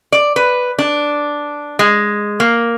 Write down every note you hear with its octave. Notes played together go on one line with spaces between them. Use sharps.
D5
B4
D4
G#3
A#3